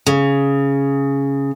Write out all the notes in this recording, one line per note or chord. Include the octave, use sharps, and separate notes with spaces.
C#3